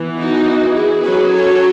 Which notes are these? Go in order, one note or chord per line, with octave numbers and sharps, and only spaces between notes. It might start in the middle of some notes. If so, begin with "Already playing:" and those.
Already playing: E3 B3
D#4 F#4
E4 G#4
F#3 C#4 G#4 B4
A4 C#5